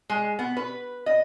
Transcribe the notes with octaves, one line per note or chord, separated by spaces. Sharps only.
G#3
B3
B4
D#5